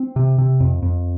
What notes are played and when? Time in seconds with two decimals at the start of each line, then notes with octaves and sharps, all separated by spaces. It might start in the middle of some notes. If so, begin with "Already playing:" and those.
Already playing: C4
0.16 C3
0.38 C3
0.60 F2
0.82 F2